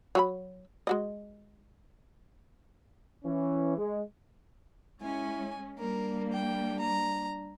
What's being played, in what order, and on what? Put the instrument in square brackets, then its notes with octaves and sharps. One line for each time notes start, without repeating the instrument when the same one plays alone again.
[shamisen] F#3 F#4 B5
G#3 F#4 D#5
[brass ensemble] E3 C#4
G#3
[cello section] G#3 C#4 [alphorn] E4 [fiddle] G#5
[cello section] G3 A#3 [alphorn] D4 [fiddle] A#4
[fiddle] G5
A#5